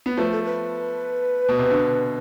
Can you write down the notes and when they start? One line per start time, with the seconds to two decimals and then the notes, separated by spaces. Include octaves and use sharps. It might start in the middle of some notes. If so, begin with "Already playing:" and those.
0.06 B3
0.17 F3 A3 B4
0.32 A4
0.44 B4
1.49 B2
1.59 C3
1.70 B2 D3